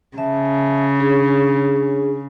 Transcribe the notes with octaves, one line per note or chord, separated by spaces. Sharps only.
C#3 E5 A5
D4 G#4 C#5